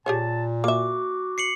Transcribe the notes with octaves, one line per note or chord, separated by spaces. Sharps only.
A#2 G4 G#4 C#5 A5
A#3 F#4 E5 D6
C7 C#7 F#7